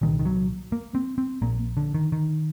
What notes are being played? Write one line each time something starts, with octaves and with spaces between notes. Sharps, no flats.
C2 A#2 D#3
D#3
F#3
A#3
C4
C4
A#1 A#2 A#3
D3
D#3
D#3